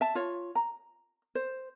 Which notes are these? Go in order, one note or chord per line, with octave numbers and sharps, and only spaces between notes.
E5 A5
F4 C#5
A#5
C5